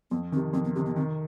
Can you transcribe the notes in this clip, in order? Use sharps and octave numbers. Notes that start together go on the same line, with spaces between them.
F2 B3
C3 D#3 C4
F2 C4
B3
C3 D#3 C4
B3
D#3 C4